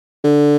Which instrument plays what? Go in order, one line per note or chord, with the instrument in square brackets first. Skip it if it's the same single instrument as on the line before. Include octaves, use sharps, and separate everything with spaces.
[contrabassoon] D3